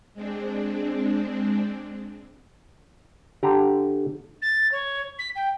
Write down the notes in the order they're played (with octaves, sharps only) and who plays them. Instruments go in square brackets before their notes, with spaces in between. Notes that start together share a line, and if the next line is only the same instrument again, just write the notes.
[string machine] G#3 C4 D4
[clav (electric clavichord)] D3 G4 A#5
[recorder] A6
C#5
B6
G5